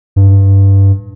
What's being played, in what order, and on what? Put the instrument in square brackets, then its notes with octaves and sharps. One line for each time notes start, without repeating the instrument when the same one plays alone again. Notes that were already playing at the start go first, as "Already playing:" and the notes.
[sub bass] G2